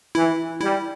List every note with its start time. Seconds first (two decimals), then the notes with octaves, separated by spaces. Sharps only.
0.15 E3 E4
0.61 G3 E4